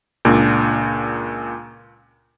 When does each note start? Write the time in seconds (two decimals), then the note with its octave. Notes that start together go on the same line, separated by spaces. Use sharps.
0.25 C#2 A#2 D4